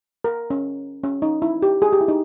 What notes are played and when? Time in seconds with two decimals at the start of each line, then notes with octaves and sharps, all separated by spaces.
0.24 A#4
0.50 C#4
1.04 C#4
1.22 D#4
1.42 E4
1.62 G4
1.82 G#4
1.92 G4
2.01 E4
2.08 D#4